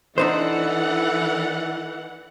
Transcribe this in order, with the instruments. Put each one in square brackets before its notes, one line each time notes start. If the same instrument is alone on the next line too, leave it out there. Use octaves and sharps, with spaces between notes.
[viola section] E3 F#5 [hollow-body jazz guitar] D4 D#4 C5 [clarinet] A4